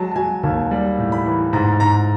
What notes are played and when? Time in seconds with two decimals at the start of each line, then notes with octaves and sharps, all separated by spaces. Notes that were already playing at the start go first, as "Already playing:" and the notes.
Already playing: F#3 G#3 A5
0.12 A5
0.16 F#3 G#5
0.43 D#2 A5
0.71 G3
0.98 A2
1.12 B5
1.26 E3
1.53 G#2 A#5
1.80 G#2 A#5